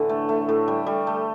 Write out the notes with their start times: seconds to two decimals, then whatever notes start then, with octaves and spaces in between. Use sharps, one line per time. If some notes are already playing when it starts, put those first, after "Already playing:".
Already playing: A2 D3 E3
0.09 A3
0.29 A3
0.49 A2
0.68 G3
0.87 G3
1.07 A3